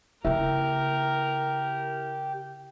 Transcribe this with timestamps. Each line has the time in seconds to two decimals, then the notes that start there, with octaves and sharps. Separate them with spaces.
0.25 C#3 A#3 E4 G4 A#4 E5